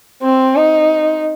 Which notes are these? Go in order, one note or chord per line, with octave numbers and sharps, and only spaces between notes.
C4
D#4